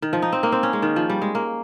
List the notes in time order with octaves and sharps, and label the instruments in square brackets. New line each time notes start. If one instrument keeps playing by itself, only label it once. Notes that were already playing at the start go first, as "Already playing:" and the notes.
[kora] D#3
F3
D#4
C4
A#3
C4
C#4
G#3
D#3
F3
G3
G#3
A#3